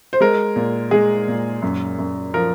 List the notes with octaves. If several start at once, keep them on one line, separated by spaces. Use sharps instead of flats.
C5
G#3 A#4
A#2
G#3 G#4
A#2
F#2
F#2
F3 A#4